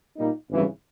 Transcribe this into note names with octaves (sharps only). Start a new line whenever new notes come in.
A#2 G3 A#3 D#4
G#1 F#2 C#3 E3 G3